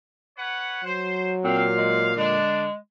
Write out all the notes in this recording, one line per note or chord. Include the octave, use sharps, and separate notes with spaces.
B4 C#5 F#5
F#3 C5
A#2 C4 F5
G#3
D3 G#3 D4